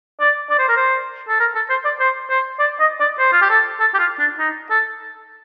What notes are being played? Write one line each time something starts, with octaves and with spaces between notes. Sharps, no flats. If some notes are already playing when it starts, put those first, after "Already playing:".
D5
D5
C5
A#4
C5
A4
A#4
A4
C5
D5
C5
C5
D5
D#5
D5
C5
F4
G4
A4
A4
G4
F4
D4
D#4
A4